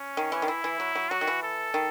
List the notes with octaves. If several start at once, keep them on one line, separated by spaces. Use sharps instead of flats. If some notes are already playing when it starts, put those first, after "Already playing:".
Already playing: C#4
D#3
E3
D#3
E3 E4
E3
F#3
F#3
F#3 F#4
D#3
E3
A4
D#3